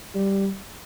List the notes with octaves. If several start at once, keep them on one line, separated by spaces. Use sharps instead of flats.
G3